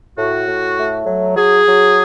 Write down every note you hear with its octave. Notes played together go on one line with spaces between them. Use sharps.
A2 F#4
A2
A3
F#3
F#3 G#4
F#3